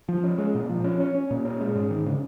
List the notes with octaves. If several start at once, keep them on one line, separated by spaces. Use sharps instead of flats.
F3
C#4
G#3
A#2
F3
C#4
C#4
C#4
A#2
C#4
G#3
G#2
D#3
C#3